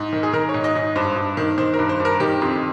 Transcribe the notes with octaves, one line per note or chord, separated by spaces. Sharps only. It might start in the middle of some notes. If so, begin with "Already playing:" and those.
Already playing: G#2
D#3
G#4
D#3 A#4
C#5
G#2
D#5
G#2
G2 C5
G2
D#3
D#3 C5
A#4
G2
C5
G2
A#4
D#3 G4
F2